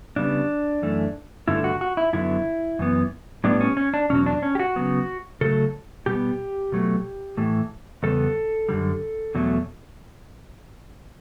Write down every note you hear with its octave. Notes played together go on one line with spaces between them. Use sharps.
C#3 G3 B3 D4
F#2 E3 A3
G2 D3 A3 E4
F#4
F#4
E4
F#2 D3 F#3 B3 E4
F#2 E3 B3
A2 G3 B3 D4
C#4
C#4
D4
E2 B2 F#3 C#4
D4
C#4
G4
F#4
C#3 F#3 B3
C#3 F#3 A3 A4
B2 G3 B3 G4
B2 F#3 A3
A2 E3 A3
E2 C#3 G3 B3 A4
F#2 D3 G3
E2 B2 F#3 A3